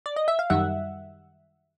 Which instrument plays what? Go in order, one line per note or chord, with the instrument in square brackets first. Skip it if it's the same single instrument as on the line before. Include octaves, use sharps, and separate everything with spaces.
[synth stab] D5
D#5
E5
F5
F#2 D#3 G3 E5 F#5